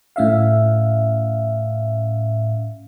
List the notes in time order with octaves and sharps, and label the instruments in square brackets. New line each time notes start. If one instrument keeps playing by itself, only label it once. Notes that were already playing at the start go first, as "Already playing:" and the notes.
[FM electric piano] A2 C#4 E5 F5